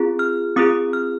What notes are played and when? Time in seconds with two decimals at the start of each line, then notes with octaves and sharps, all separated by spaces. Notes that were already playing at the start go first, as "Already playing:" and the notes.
Already playing: C4 F4 G#4
0.19 F6
0.56 C4 F4 G#4 D#6
0.93 F6